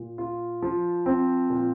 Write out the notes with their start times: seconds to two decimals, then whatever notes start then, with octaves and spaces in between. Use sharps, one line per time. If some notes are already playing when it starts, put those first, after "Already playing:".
Already playing: A#2
0.18 F4
0.62 F3
1.06 C4
1.50 A#2